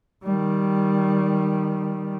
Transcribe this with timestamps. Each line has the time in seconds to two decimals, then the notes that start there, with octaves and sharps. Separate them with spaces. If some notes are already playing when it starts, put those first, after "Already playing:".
0.24 D#3 G3